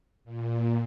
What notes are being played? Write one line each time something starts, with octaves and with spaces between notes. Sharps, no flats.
A#2